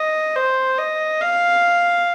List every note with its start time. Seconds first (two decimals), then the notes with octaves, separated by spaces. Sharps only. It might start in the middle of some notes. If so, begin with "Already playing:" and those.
Already playing: D#5
0.36 C5
0.78 D#5
1.21 F5